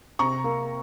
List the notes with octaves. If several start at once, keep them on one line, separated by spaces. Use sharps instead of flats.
C3 A#5 C#6
A#3